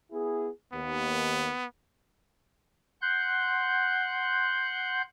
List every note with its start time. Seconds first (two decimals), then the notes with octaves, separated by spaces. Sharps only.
0.12 B3 E4 G#4
0.73 D#2 B3
3.02 F#5 C6 F#6 G6